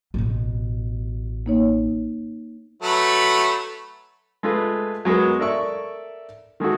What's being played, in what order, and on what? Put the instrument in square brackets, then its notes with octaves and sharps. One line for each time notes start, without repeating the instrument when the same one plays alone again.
[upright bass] A1 B2
[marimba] A#3 D#4 C#5
[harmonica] F#3 A3 B4
[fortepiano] G#3 A3 F4 B4
F#3 G#3 B3 A#4
A4 A#4 D5 E5 C#6
D#3 G#3 A3 F#4